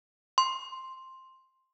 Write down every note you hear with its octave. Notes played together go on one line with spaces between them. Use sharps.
C6